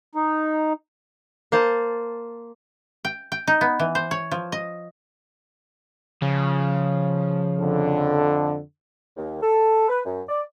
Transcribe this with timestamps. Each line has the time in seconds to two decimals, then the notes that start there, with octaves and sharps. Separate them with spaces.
0.15 D#4
1.52 A#3 C5 A5
3.05 G5
3.32 G5
3.47 D#4
3.61 B3
3.80 E3
3.95 C5
4.11 C#5
4.31 F3
4.52 D#5
6.22 C#3 F3
7.58 F2 D3
9.17 D#2
9.42 A4
9.89 B4
10.06 F#2
10.28 D5